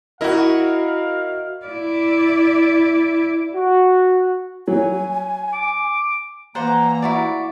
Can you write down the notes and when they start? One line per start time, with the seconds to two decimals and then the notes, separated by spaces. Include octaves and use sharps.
0.21 E4 F#4 A#4 D#5 F5
1.66 E4 D5
3.54 F#4
4.68 F#3 G#5
5.54 D6
6.55 E3 A#3 C5 D5 F#5 A#5
7.02 E4 F#4 D5